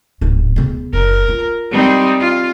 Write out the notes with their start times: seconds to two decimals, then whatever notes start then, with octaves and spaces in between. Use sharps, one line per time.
0.21 D1 G#2
0.56 C#3 B3
0.93 F#1 A#4
1.28 F4
1.71 G3 C4 D#4
2.19 F4